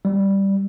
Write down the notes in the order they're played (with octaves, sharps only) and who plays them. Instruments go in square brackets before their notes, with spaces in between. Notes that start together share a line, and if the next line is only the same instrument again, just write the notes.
[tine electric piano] G3